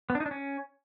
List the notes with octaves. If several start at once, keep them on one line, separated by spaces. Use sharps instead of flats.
B3
D4
D#4
D4
C#4